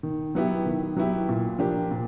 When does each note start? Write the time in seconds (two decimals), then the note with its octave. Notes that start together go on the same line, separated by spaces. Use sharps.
0.03 D#3
0.35 F#3 B3 E4 G4
0.66 D#3
0.96 F#3 B3 E4 G4
1.29 A#2
1.59 F3 A#3 D4 G4
1.91 A#2